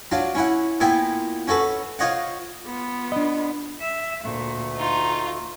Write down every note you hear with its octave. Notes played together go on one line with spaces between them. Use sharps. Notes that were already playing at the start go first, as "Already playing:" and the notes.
F#3 D4 F4
C#4 E4 F#5
A#2 B3 E4 G5 G#5
C#4 F#4 A4 B4
F4 C5 C#5 D#5 F#5
B3 F4
D4 D#5
E5
D2 A#2 A3
D#4 F4